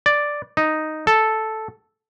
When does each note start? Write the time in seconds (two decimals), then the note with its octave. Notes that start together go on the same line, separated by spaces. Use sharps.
0.06 D5
0.57 D#4
1.07 A4